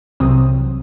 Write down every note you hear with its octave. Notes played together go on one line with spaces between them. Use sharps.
C2 C3 E3 F#3 C4 D#6